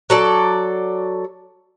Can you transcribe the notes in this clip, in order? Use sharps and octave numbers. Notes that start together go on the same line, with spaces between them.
F#3 A4 D5